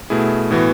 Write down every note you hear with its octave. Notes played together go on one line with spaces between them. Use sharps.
B2 A3 E4 G#4
A2 E3 B3 F#4